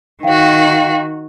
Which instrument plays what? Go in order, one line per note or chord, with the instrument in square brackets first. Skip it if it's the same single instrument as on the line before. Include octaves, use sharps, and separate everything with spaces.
[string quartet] D#3 F#4 [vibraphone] F5 G5